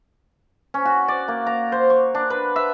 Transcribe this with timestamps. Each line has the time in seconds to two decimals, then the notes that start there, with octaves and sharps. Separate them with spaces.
0.74 C#4
0.85 F#4
1.08 D5
1.28 A#3
1.47 A#5
1.72 C5
1.90 C#6
2.15 D4
2.30 B4
2.56 E5